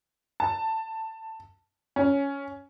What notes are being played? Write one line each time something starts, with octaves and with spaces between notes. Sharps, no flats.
A5
C#4